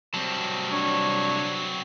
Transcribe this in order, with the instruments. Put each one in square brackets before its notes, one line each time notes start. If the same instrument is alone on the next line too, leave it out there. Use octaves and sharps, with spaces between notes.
[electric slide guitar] C3 G3 A5 [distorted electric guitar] F#3 C4
[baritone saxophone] D4 [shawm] C#5